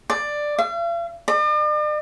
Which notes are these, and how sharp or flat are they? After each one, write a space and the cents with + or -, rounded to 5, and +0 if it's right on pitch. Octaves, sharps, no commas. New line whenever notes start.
D5 +10
F5 -45
D5 +45